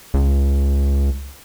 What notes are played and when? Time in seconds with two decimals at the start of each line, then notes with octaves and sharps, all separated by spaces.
0.14 C#2